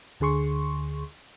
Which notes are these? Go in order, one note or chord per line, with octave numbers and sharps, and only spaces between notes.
D2 D3 G#4 C6 C#6